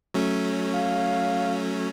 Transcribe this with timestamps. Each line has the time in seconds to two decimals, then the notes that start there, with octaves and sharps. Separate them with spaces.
0.14 F#3 A3 C#4
0.74 F5